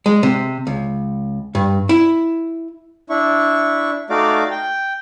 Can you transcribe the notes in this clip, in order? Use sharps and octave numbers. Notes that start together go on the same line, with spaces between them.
G#3
C3
C#2
G2
E4
D4 E4 C#6
A3 D#4 F#4 D5 F5 D6
G5